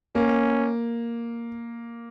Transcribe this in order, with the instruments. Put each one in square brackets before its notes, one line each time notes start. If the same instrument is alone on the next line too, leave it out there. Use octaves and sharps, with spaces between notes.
[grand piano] A#3 [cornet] C#4